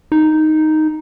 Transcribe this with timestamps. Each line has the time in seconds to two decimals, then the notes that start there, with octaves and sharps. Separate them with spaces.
0.12 D#4